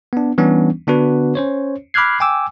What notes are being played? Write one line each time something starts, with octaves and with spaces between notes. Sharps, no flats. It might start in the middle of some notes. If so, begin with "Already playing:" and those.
B3 D4
E3 G3 B3 C#4 D4
D3 B3 D4 F#4 B4
C#4 C5 C#5
B5 D6 F6 F#6 G#6 C7
G5 G#5 D6 E6